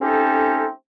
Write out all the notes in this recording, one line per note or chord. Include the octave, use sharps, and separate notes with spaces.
A3 C4 C#4 D#4 G4 A4